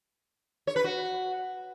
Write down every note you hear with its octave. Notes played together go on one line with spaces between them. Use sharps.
C#5
B4
F#4